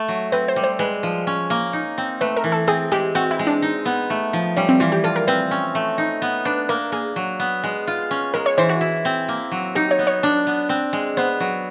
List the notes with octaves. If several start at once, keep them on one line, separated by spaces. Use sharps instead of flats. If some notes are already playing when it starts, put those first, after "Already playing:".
Already playing: A3
F#3
C4 B4
C5
G3
C5
G#3 B4
F3
C#4
A#3
D#4
C4
A3 B4
A#4
E3
A4
C4 G#4
G#3 G4
C4 F#4
E4
G#3
D4
D#4
B3
A3
F3
G3 C#4
C4
E3 F4
G4
F4 A4
A#4
C4 B4
C#4
A3
D#4
B3
D4 B4
A#3 A#4
A#3 G#4
F#3
B3
G#3
F4
C#4
G#3 A#4
C#5
E3 C5
F#4
E4
C4
A#3
F#3
D#4 G4
C#5
B3
C#5
D4
B3
C4
G#3
B3 C5
F#3